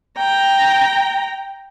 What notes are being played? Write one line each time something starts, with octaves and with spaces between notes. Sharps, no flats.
G5 A#5